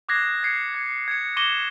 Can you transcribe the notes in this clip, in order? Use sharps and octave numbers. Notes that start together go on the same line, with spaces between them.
D6 D#6 F#6 G#6 A#6 C7
G#6 C7 C#7
G#6 C#7
G#6 C#7
C#6 D6 A#6 D#7 E7 G7